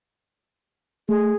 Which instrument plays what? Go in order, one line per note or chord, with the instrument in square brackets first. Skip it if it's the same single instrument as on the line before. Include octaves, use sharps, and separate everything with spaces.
[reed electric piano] A3 [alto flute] G#4